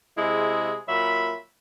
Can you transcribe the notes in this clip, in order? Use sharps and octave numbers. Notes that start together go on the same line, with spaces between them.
C3 G#3 E4 G#4
A#2 F#3 E5 B5